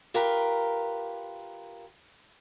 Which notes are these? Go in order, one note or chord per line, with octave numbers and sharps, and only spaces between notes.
F4 G4 A#4 B4